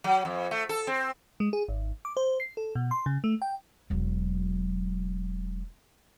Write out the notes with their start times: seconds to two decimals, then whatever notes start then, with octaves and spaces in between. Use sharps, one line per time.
0.04 F#3
0.25 F2
0.51 A3
0.69 A4
0.87 C4
1.40 G#3
1.53 G#4
1.68 G#1
2.05 D6
2.17 C5
2.40 C7
2.57 A4
2.75 B2
2.91 C6
3.06 C#3
3.24 A3
3.42 G5
3.90 E1 F#3